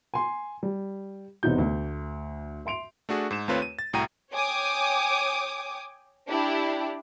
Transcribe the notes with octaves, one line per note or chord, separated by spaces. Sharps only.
G#5 C6
G3
E1 C3 B3 D#4 G6
D2
E5 C6 D7 F7
A3 D4 F#4 G#4
G#2 E7
D#2 A3 C4 F4 B4 C#5
D#7
A6
C2 A2 F#4 G5 A#5 D#7
C#5 G5 G#5 D6 D#6
D4 E4 G4